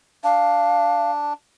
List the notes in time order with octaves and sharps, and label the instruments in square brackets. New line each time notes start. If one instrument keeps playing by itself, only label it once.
[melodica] D4 [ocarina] F5